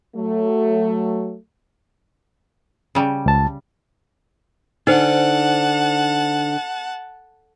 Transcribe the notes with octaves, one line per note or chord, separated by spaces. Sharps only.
F#3 A3
C#3 G3
C#2 A5
D3 D#4 C5 F#5 A5